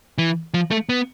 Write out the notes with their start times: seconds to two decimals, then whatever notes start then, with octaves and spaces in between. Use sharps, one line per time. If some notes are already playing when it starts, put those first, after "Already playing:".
0.18 E3
0.54 F3
0.71 A3
0.89 B3